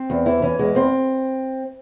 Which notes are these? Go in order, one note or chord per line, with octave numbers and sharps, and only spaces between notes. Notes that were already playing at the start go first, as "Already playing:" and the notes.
Already playing: C4
E2
E3 E4
E3 C#4
E2 G#3
E2 C4